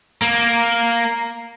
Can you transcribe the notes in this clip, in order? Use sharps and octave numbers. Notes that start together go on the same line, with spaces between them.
A#3